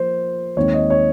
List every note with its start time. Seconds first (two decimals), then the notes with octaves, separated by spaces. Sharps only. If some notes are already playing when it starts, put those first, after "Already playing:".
Already playing: F3 A#3 C5
0.57 D#2 D#3 G#3 C4 C#5
0.74 D#5
0.90 C#5